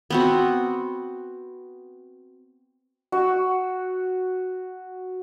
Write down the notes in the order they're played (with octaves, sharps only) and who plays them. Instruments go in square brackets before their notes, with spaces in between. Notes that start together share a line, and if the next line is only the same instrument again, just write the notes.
[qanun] B3 C4 F#4
[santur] F#4 E6